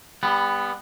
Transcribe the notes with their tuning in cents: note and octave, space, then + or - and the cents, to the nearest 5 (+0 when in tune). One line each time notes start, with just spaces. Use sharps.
G3 +30 B3 +0